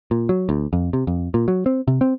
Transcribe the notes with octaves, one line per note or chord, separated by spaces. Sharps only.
A#2
F#3
D2
F2
C3
F2
A#2
F#3
C4
C3
C4